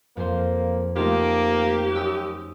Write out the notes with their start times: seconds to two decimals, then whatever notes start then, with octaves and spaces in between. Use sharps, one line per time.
0.17 F2 A#3 C5
0.96 A3 A#3 D#4 F4 G4
1.93 F#2 D#6 E6 F#6